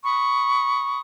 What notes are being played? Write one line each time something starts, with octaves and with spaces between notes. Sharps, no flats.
B5 C#6 D#6